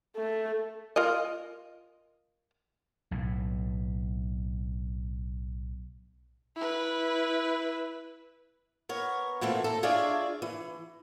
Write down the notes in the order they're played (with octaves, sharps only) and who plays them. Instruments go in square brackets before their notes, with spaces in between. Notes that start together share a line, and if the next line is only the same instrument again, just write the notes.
[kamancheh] A3
[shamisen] F4 A#4 D#5
[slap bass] B1 A2
[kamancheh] E4 B4
[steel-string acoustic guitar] B3 A#4 C#5
A#2 E3 F#3 A3 C4
A4 A#5
D4 F4 G#4 C#5 D5 E5
E3